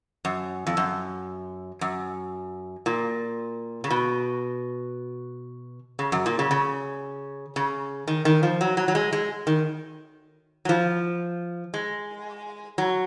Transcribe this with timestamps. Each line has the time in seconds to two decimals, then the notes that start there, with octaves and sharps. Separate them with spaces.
0.25 F#2
0.67 F2
0.77 F#2
1.81 F#2
2.86 A#2
3.84 C#3
3.90 B2
5.99 C#3
6.12 F#2
6.26 A#2
6.39 C#3
6.51 C#3
7.56 C#3
8.08 D#3
8.25 D#3
8.43 F3
8.61 F#3
8.77 F#3
8.88 F#3
8.95 G#3
9.13 G#3
9.47 D#3
10.65 F#3
10.69 F3
11.74 G#3
12.78 F#3